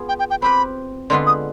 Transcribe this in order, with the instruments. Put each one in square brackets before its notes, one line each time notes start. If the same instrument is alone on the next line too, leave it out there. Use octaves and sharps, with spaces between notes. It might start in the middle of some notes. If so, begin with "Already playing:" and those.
Already playing: [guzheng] B3 F4 G#4
[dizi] G5
G5
G5
[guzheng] C4 G4 B4 [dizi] B5
[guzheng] D3 G#3 B3 F4 B4 [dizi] C6
[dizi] D#6